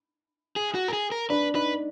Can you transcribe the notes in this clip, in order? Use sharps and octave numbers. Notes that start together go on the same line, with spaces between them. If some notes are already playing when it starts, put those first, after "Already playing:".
G#4
F#4
A#4
G#4
A#4
D4 B4
D#4 B4